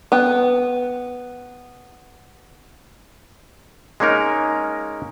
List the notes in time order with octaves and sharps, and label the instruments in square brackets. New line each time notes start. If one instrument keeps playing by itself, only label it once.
[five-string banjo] B3 G5
[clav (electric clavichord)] G#3 A#3 C#4 D#4 A#4